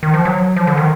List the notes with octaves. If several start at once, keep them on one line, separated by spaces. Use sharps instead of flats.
D#3
F3
F#3
F3
D3
D#3